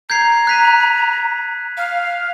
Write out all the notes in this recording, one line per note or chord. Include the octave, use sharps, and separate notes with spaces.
A#5 G6 G#6 C7
F#6 B6 D#7
F5